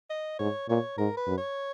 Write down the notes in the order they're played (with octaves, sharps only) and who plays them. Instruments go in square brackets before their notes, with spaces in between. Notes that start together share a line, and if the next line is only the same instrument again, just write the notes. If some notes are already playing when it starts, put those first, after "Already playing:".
[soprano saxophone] D#5
[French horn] G#2 [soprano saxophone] C#5
[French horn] A#2 [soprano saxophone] C#5
[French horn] G#2 [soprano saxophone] A#4
[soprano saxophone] B4
[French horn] F#2
[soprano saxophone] C#5